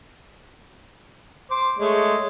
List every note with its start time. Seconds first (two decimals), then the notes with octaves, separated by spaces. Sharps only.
1.51 C5 D6
1.79 G#3 A3 C#5